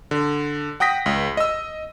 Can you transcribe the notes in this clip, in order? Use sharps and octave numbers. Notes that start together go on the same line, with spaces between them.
D3
F#5 G5 D#6 A#6 B6
C#2
D#5 E6